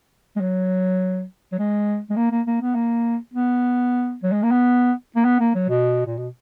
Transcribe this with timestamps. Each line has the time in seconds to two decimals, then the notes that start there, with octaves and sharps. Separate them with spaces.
0.36 G#3
0.41 F#3
1.52 F#3
1.58 G#3
2.10 G#3
2.16 A#3
2.31 A#3
2.47 A#3
2.61 B3
2.75 A#3
3.34 B3
4.23 F#3
4.32 G#3
4.43 A#3
4.51 B3
5.16 A#3
5.25 B3
5.40 A#3
5.55 F#3
5.69 B2
6.06 A#2
6.17 B2